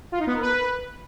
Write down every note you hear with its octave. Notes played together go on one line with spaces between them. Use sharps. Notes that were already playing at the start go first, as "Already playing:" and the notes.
F4
D#4
B3
A#4
B4